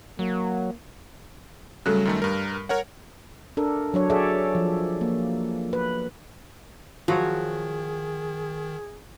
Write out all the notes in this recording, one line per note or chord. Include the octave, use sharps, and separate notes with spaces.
F#3 A#3
C#3 F#3 G3 A3 A4 F#6
F#2 D#3 A3
G2 A#4
A#4 C#5 F#5
D4 A4 A#4
F#3 D4 C#5
F#4 G#4 A4 C#5 D5 E5
F3
A#3
B4
D#3 F3 F#3 F#4 G#4 C#5